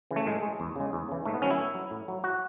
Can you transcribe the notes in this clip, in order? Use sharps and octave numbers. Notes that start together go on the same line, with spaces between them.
C#3 E3
A3
A2 G#3
G#3
E2
C#3 G#3
E2
C#3 E3
G#2 A3
B3
D#3 F#3 C#4
E4
A2
F#3
A2
F#3
F#4